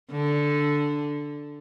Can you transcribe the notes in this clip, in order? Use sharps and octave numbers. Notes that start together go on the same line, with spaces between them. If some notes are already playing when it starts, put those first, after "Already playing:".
D3